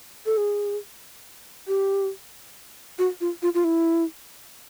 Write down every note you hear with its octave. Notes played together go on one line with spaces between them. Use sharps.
A4
G#4
G4
F#4
F4
F4
F4
E4